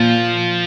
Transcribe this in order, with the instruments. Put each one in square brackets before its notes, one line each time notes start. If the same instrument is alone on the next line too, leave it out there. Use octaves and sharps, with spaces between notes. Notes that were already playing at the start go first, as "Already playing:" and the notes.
Already playing: [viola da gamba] A#2 A#3 [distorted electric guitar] F3